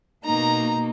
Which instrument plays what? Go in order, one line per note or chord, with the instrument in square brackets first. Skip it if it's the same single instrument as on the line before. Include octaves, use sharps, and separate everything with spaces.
[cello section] B2 A#3 [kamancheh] D#4 [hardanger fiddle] A#5